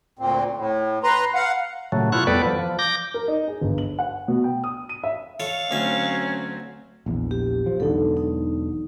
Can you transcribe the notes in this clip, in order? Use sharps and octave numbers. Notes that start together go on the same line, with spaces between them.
D2 A#2 C4
A2
B4 A#5 C6
F5 F#5
A#2 C#3 F#3 A3
B2 E4 F4 C#6 F#6
F2 G3 B3 A4 B4 D5
F3
F3
D6 G6 A#6
A#4
D#4
G#4
G1
F#7
F#5
B2
G5
D#6
D#7
E5
A4 C#5 F5
D2 F#3 C4 C#4 E5
A#1 E2
G4
F3
E1 B1 D3 D#4 A4
D#4